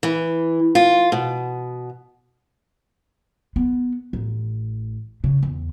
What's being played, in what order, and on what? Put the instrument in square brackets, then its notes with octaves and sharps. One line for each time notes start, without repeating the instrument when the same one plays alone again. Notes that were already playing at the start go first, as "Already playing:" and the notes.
[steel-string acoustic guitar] E3
F4
B2
[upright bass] B3
A1
C#3
E2